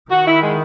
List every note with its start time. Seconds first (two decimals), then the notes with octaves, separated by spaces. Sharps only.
0.11 D#3 F#4
0.27 E4
0.42 G#3